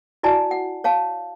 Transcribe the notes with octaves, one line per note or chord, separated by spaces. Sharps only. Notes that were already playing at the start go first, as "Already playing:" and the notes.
E4 F#4 D5 G#5 A5
F#5
C#5 F5 A5